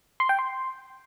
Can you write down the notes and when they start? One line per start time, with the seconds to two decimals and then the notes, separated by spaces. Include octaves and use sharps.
0.20 C6
0.29 G5
0.39 C6